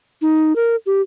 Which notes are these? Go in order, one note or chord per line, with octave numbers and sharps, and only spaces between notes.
D#4
A#4
G4